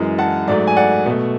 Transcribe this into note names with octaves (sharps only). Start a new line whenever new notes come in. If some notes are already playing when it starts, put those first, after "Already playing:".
Already playing: F#2 E3 G#3
F#5 A5
G#2 F#3 A3 D5
G#5
D5 F#5
B2 A3